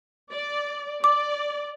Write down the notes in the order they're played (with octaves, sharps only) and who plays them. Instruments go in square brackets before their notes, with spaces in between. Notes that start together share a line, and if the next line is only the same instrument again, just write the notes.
[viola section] D5
[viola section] D5 [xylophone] D6